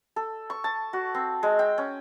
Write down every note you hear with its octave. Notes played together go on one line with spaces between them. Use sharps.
A4
C#6
A5
F#4
C4
G#3
G5
C#4